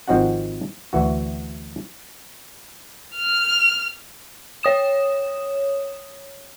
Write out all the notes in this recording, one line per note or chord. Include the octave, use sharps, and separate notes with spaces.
G#1 F3 C4 D#4 F#4 F#5
D2 E3 F#4
F6
C#5 D#6 E7